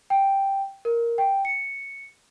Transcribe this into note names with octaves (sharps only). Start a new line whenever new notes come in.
G5
A#4
G5
C#7